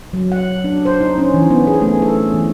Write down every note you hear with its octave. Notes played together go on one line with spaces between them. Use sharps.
F#3
F#5
D4
C5
D#4
C#4
E3
B3
G#4
A3
A4
E3